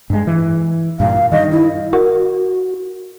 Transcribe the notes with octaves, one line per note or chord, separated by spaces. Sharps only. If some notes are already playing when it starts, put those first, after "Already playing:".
G2 G#3
E3
G2 A#2 F5
G2 D#3 D#5
E4
F#4 A#4